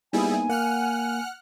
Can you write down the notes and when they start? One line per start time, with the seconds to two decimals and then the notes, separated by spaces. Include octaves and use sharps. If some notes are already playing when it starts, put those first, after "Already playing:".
0.13 G3 A#3 B3 D#4 E4 G#4 G#5
0.50 A#3 F#5 F6 F#6